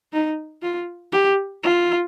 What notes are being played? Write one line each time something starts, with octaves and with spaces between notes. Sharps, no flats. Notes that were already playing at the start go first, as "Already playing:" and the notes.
D#4
F4
G4
F4